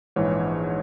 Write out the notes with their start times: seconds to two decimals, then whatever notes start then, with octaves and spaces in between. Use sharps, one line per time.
0.16 A#1 G#2 E3 C#5